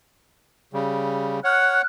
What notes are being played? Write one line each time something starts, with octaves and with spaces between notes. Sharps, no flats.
C#3 G3
C#5 F#5 F6 F#6